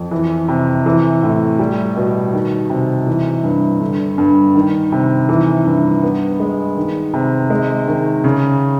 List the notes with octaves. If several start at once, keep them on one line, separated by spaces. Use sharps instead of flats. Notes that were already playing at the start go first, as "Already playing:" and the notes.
Already playing: F2
E3
C3
E3
A2
G3
B2
D#3
C3
E3
G2
D3
G2
D#3
C3
E3
G2
B3
G#3
D#3
C3
G#3
D#3
C#3